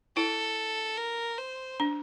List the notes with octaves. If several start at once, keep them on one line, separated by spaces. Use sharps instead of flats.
E4 A4
A#4
C5
D4